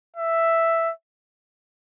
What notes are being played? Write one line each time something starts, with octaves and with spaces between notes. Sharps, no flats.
E5